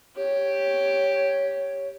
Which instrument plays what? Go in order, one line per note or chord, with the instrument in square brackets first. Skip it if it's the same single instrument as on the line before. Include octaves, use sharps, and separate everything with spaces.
[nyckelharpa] G4 [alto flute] C#5